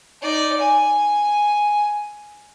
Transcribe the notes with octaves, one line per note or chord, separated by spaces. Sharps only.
D#4 D5
G#5